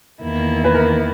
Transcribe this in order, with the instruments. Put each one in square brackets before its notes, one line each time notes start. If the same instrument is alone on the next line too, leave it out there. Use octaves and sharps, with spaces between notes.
[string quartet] E2 D#3 A#3 E4
[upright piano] B4
A#4